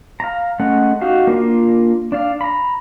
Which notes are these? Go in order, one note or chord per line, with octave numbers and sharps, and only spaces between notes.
F5 A#5
G#3 A3 C#4 F#5
D#4 F#4 G4 F5
A#3 D4 F4 A#4
D4 D5 F5
A#5 B5